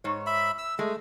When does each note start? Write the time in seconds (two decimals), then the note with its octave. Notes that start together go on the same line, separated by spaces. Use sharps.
0.04 G#2 C#5
0.26 E5 B5
0.58 E6
0.79 G#3 A3